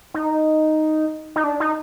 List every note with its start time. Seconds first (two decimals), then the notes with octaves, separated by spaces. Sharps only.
0.14 D#4
1.36 D#4
1.44 D4
1.60 D#4